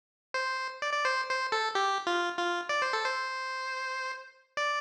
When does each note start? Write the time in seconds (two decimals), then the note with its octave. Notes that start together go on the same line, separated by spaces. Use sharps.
0.34 C5
0.82 D5
0.93 D5
1.05 C5
1.29 C5
1.52 A4
1.75 G4
2.07 F4
2.38 F4
2.69 D5
2.82 C5
2.93 A4
3.06 C5
4.57 D5